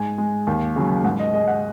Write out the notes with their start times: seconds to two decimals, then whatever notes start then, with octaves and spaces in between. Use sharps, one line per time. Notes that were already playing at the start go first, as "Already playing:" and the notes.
Already playing: G#2 G#5
0.18 G#3
0.47 D#2
0.76 C#3 F#3
1.04 G#2 F#5
1.19 D#5
1.33 G#3 D#5
1.48 F#5